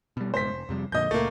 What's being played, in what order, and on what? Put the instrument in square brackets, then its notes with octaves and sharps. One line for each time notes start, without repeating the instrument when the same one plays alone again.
[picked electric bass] B2 G3
[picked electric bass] F#1 G#2 B2 [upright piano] C5 B6
[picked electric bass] F1
F2 C3 G3
[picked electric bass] F2 A#2 D3 [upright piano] D#5 G6
[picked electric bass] C#2 A#2 [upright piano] A3 A#3